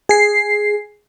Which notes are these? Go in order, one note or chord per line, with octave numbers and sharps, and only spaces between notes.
G#4 C7